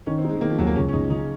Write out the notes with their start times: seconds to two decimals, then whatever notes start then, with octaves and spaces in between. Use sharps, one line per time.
0.06 D#3 C#4
0.18 C4
0.24 G#3 D#4
0.36 G#3
0.41 D#3 A#3
0.50 F3
0.58 D#2 F#3
0.67 A#3
0.76 C#2 C#4
0.88 C#4
0.93 C#2 D#4
1.10 C#3 D#4